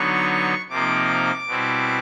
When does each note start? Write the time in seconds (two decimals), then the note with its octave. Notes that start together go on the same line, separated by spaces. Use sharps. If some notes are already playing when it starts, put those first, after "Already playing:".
Already playing: D3 F#3 B3 D#4 C#6
0.69 C3 F3 A#3 D#4 D6
1.47 B2 G3 C4 E4